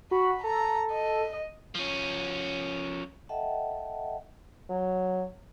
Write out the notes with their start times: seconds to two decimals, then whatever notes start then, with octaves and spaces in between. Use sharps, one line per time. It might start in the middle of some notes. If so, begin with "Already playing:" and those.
0.11 F#4 B5
0.44 A4 A#5
0.92 D#5
1.75 F3 C#4
3.29 A4 D#5 E5 F#5 G5 A5
4.70 F#3